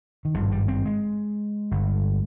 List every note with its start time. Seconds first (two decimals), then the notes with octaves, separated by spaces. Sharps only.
0.25 D#3
0.34 G#1 G2 F3
0.52 G3
0.68 C4
0.85 G#3
1.71 G1 G2